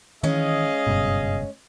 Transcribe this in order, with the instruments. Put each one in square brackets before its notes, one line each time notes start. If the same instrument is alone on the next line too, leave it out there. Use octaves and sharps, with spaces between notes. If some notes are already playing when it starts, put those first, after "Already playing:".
[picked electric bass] D#3 E3 [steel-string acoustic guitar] G#3 C#4 [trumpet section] G#4 D#5 F5
[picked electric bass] F#1 G2 B2